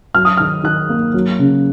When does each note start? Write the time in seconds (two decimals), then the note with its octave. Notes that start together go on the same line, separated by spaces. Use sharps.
0.15 F#3 F6
0.25 D#6
0.37 D#3 F6
0.64 D#3 F#6
0.89 A#3
1.14 F#3
1.39 C#3